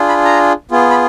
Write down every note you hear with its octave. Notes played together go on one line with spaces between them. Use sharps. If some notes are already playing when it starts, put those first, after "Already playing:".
Already playing: D4 F4 G#4
B5
A#5
B3 F4 G#4
B5